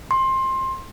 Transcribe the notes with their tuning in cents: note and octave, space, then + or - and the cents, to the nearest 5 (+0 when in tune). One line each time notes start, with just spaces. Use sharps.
C6 +20